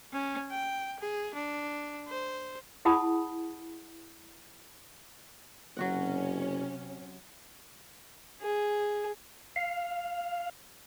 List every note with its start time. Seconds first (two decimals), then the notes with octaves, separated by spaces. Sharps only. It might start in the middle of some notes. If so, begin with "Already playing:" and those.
0.13 C#4
0.51 G5
0.99 G#4
1.34 D4
2.08 C5
2.85 E4 G#4 F#5 A5 B5 D#6
5.77 F#1 C3 F#3 C#4 F#4 F#5
8.42 G#4
9.56 F5